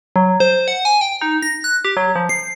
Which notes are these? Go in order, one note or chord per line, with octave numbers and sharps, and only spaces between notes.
F#3
C5
F#5
G#5
G5
D#4
A#6
F#6
G4
F#3
F3
C7